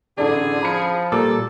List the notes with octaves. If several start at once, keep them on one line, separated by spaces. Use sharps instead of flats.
A1 D3 G#4 A4 D5
F3 B5 C#7
A#2 G3 A4 D6